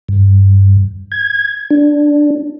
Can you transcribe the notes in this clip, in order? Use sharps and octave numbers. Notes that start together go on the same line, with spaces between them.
G2
G#6
D4